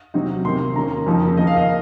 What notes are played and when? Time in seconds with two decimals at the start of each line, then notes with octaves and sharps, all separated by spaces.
0.14 C3 F#3 C4 D#4
0.45 C3 D#3 A#3 C6
0.76 D#3 A#3 C#4 A#5
1.06 F2 C#3 F3 A#3 D#4
1.37 D#3 A#3 D#4 D#5
1.47 F5
1.57 D#5